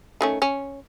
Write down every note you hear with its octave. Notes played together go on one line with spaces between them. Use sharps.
D#3 A3 C#4
C#4